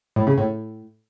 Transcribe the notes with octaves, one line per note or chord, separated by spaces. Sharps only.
A2
C#3
A2